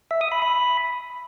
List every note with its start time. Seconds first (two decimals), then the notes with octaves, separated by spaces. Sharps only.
0.11 E5
0.21 D#6
0.32 B5
0.42 B5